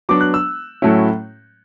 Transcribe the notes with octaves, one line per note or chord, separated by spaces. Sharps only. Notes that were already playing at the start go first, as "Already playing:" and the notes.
F#3 B3 D4 D6
F#6
E6
A2 F#3 A3 C#4 E4